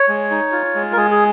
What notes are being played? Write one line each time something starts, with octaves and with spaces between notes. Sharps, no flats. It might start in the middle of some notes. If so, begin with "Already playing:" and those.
Already playing: C#5
G#3
D#4
F4
G#3
A#4
G#3 G#4
G#4